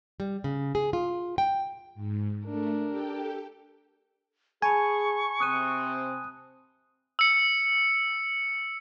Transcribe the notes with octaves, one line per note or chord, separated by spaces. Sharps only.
G3
C#3
G#4
F4
G5
G#2
A3 D4 A#4
G4 A4 G5
G#4 G#5 A5 B5 C#6
C3 C4 D#6 F#6 D#7
E6 C#7